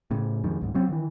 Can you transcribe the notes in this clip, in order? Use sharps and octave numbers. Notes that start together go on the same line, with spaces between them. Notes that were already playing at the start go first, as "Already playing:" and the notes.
A2 C#3
F2 D#3 G#3
C2 G#2
F#3 C4 C#4
D#3 E3